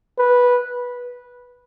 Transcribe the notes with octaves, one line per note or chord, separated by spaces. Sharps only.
B4